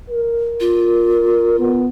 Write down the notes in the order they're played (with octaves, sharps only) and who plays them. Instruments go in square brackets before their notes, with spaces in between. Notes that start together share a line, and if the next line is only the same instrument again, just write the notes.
[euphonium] A#4
[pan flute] F4
[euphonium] B3